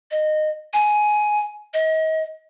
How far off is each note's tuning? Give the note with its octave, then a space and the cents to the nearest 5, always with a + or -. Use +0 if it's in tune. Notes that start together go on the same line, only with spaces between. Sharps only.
D#5 -15
G#5 +15
D#5 +35